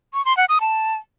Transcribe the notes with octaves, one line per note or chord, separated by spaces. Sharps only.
C#6
C6
F#5
D#6
A5